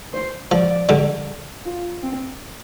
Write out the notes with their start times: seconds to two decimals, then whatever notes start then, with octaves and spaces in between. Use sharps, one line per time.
0.13 C5
0.51 F3 D5
0.89 D3 G3
1.65 F4
2.03 C4